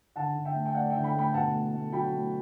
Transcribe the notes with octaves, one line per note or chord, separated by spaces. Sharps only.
D3 F#5 A5
D3
E5 G5
A3
G5
A3 D5 F#5
D3 E5 G5
G5 B5
A3 G5 B5
B2 F#5 A5
A3
A3
F#3 G5 B5
A3